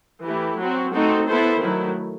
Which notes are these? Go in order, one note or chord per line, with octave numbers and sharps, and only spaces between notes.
E3 A3 E4 G4
F#3 C4 F#4
A3 C4 D#4 F#4 A4
B3 E4 A4 C5
D#3 F#3 A3 E4